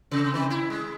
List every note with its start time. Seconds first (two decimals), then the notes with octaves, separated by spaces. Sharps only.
0.11 C3
0.34 D#3
0.50 E4
0.70 G#3